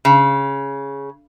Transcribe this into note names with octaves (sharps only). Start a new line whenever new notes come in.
C#3